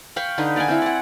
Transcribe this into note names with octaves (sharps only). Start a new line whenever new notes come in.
F5 G5 B5 C#6
D3 D#4 B4
D5 F5 F#5 G#5
C4 E4
D5 F#5